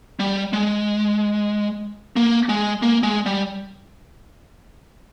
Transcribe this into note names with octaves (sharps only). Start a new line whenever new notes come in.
G3
G#3
A#3
G#3
A#3
G#3
G3